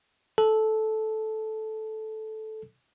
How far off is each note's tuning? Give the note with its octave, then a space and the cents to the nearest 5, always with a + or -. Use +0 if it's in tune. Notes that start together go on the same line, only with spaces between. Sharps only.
A4 -10